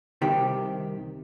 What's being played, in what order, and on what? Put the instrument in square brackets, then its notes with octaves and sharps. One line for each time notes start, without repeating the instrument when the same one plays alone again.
[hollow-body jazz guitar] C2 C3 D#3 G4